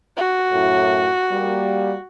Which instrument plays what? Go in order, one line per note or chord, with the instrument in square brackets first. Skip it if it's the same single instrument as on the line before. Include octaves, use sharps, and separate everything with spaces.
[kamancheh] F#4
[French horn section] F#2 A2
G3 A#3